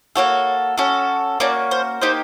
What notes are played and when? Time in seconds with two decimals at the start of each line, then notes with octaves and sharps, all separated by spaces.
0.16 A#3 D#4 F#4 A4 C#5
0.78 C#4 F#4 A4
1.40 A#3 C#4 F#4 D5
1.71 C5
2.02 A#3 D#4 G4 C5